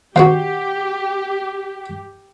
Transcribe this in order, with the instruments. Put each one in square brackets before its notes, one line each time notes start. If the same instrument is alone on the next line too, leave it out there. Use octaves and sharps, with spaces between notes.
[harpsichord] D#3 C4 F#4 [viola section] G4 [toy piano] F#5